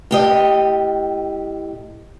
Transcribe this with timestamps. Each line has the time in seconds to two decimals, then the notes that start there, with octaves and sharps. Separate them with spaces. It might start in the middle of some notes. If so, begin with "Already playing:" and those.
0.11 A2 G4 D#5